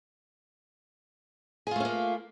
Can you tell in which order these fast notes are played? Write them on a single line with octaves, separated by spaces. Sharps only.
G#4 F4 A3 C#4 A#3